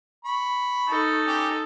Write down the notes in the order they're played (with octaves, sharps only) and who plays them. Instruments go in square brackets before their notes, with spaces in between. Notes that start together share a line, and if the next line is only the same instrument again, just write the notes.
[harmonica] B5 C#6
[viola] D#4 A4
[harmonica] C#4 G4